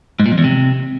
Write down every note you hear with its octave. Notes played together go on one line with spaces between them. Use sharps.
G#2
A#2
F2
E2
C3